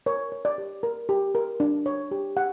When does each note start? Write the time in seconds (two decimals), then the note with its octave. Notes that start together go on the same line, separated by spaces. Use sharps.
0.06 A#4 C#5
0.32 C#5
0.45 D5
0.58 G4
0.83 A#4
1.09 G4
1.35 A#4
1.60 D4
1.86 C#5
2.11 G4
2.36 G4 F#5